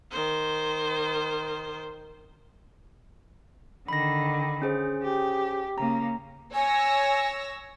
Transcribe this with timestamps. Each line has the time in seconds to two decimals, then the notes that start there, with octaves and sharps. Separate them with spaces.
0.11 D#3 C5
3.88 D3 D#3 B5 A#6
4.62 C#4 G#4 C5
5.03 G4
5.78 C#3 A#3 A#5
6.55 C#5 G#5 E6 A#6